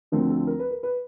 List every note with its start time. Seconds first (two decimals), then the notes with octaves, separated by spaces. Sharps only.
0.12 D2 D3 F3 A3 C4 A#4
0.29 A4
0.47 A#4
0.59 B4
0.71 A#4
0.83 B4